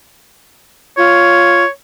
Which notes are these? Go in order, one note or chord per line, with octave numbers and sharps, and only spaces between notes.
F4 C#5